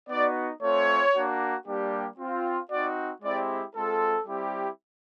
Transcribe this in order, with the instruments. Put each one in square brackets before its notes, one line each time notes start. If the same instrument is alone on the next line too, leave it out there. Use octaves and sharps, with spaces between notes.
[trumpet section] B3 D#4 F#4 D5
A3 C4 F4 C#5
A#3 D4 F#4
G3 A#3 D4 G4
C4 F4
C4 D#4 F#4 D5
G#3 C4 E4 G4 D5
G#3 C4 F4 A4
G3 C4 E4 G4